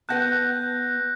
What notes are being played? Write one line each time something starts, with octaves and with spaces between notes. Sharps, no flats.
B3 B4 F#5 A5 F#6 G6 A#6